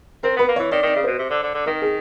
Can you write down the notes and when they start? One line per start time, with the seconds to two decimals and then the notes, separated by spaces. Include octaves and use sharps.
0.23 C4 A#4
0.36 B3 B4
0.48 A#3
0.56 E3 C#5
0.71 D#3 D5
0.83 D#3 D5
0.96 C#3
1.04 B2 C5
1.19 C3
1.30 D3
1.43 D3
1.54 D3
1.66 D#3 A#4
1.82 G#4